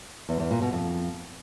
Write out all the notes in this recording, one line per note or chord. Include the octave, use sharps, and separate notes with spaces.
E2
E2
A#2
B2
F2